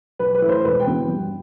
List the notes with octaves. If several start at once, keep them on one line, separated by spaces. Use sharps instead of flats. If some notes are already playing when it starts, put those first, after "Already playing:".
B1 B4
B4
A2 E3 A3 E4
C5
E1 B4
G5
E2 B2 B3
G2